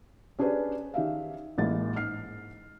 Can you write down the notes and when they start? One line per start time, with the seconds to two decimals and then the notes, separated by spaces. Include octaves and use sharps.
0.39 C#4 D4 G4 G#4 B4 D5
0.94 D#3 G4 E5 F5
1.58 A1 A2 G#3 A#3 A6
1.96 G#2 F6 C7